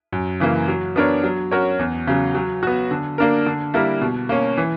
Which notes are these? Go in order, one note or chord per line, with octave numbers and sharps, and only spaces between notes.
F#2
C#3 E3 A#3
F#3
B3 D4 A#4 C#5
F#3
C#4 F#4 A#4 C#5
E2
C#3 F#3
F#3
B3 F#4
D3
A#3 D4 A#4
D3
G3 A#3 E4 A#4
B2
A#3 C#4
E3